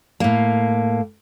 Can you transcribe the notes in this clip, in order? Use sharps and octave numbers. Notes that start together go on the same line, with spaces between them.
A2 A#3